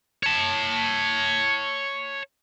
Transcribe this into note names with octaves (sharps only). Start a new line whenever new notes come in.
C#5 A5